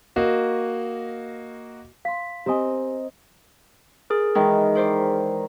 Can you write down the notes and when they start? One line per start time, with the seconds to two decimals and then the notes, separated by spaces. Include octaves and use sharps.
0.16 A#3 F#4 D#5
2.05 F5 C6 B6
2.46 C4 G4 A#4 D#5 G#5
4.10 G#4 A#4
4.35 D#3 E3 G#3
4.75 E4 C5 D5